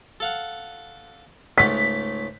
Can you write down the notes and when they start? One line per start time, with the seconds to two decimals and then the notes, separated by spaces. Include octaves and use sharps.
0.20 A4 F5 F#5
1.58 C#2 G#2 A3 B6